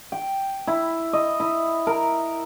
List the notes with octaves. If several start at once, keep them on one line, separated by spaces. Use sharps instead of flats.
G5
E4
D#5
E4
A#4